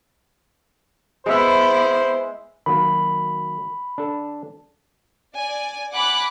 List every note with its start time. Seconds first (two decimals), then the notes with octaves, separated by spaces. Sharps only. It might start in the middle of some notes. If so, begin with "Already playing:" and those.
1.26 G#3 B3 E4 C5 E5
2.66 D#3 F#3 A#3 B5
3.98 D4 A4
5.34 D5 G#5
5.94 F#5 G#5 B5 D6 F#6